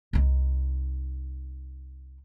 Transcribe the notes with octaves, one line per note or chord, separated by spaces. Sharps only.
C2 D#4